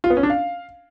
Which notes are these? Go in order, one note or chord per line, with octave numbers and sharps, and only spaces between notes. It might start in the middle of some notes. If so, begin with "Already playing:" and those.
F4
B3
C#4
D4
F5